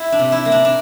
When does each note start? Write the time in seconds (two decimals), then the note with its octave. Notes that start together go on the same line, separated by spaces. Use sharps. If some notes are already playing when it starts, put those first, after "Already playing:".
Already playing: E4
0.12 D4
0.19 C3
0.32 E4
0.45 A#3
0.52 D4
0.65 D4